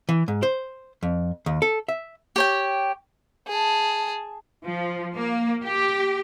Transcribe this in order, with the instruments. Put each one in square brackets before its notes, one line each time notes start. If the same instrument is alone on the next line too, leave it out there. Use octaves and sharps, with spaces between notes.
[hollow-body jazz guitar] E3
G#2
C5
F2
D#2
A4
E5
[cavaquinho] G4 C#5 G5
[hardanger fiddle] G#4 A5
[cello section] F3
A#3
G4